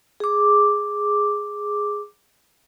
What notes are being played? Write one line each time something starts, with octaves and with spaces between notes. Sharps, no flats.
G#4 D6